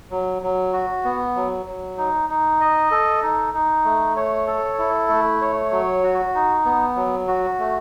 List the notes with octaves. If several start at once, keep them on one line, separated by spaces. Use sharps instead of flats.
F#3
F#3
F#4
B3
F#3
F#3
D#4
D#4
D#5
A4
D#4
D#4
A3
C#5
A4
E4
A3
C#5
F#3
F#4
D#4
B3
F#3
F#4
A3